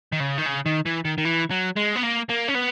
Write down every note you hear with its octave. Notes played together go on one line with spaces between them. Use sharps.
D#3
C#3
D#3
C#3
D#3
E3
D#3
D#3
E3
F#3
G#3
B3
A#3
A#3
C#4
B3